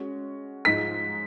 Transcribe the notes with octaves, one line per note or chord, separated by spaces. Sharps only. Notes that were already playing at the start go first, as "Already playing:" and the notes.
Already playing: G#3 C#4 F#4
G#2 F3 G#3 D#4 B6